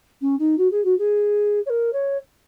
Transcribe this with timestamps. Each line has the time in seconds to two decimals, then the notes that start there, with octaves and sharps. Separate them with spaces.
0.21 C#4
0.39 D#4
0.58 F#4
0.71 G#4
0.85 F#4
0.99 G#4
1.66 C#5
1.70 A#4
1.93 C#5